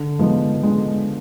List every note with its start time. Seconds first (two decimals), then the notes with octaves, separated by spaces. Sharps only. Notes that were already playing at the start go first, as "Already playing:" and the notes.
Already playing: D3
0.19 F3 G#3 B3 D#4
0.63 D3 G#3